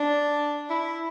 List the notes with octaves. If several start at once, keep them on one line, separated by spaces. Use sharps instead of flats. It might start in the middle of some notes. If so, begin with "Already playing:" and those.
Already playing: D4
E4